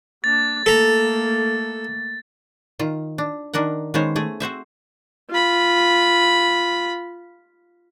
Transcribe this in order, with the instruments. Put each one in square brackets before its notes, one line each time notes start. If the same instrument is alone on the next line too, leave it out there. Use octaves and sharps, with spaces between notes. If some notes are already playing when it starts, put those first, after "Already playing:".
[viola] A#3 D4 [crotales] A6
[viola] A3 A#3 [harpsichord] A4 A#5
[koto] D#3 F4
D4
D#3 D4 A#4 F#5
D#3 G#3 B3 C#4 C5 C#5
A3 G#4
C4 F#4 C5 E5
[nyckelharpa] F4 B5